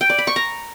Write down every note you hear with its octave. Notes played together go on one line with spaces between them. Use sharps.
G5
D5
B5
C#6
A#5